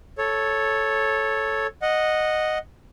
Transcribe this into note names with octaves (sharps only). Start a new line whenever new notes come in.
A4 C#5
D#5 F#5